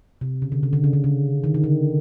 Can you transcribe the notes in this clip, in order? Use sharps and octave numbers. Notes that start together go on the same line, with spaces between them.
C3
C#3
D3
C#3
D3
C#3
D3
C#3
D#3
D#3
D3